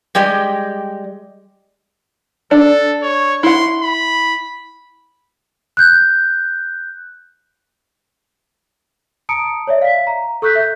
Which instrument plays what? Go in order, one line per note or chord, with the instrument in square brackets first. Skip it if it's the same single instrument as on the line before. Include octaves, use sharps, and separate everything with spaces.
[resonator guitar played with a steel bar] G3 G#3 G4 D5 D#5
[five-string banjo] D4 [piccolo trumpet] A4
[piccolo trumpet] C#5
[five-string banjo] E4 F#5 [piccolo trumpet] C6
[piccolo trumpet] B5
[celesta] F#6 G6
A5 A#5 D#6 C#7 D7
C#5 D5 E5
F5 B6
A#5
A4 C#6 E6 F#6 G6 B6
E5 G6